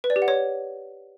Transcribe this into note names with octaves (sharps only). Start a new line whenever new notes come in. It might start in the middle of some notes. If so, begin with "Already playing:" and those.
B4
D5
G4
F#5
C#5